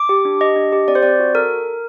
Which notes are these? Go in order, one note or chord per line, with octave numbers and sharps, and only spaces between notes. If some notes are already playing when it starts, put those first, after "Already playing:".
Already playing: D6
G4
D4
G4 D#5
D4
G4
C4 D5
C5
C4 D5
F#4
A4 A#4